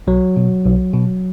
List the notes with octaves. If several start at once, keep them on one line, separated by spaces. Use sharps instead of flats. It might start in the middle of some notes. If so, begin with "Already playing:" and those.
B1 F#3
B2
B1
B2